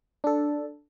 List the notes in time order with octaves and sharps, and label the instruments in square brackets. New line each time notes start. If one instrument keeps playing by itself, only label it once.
[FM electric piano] D4 A4